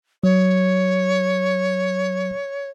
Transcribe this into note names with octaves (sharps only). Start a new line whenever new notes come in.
F#3 C#5